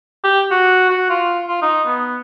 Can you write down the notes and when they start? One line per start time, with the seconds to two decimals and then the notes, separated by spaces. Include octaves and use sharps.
0.24 G4
0.52 F#4
0.90 F#4
1.10 F4
1.48 F4
1.62 D#4
1.87 B3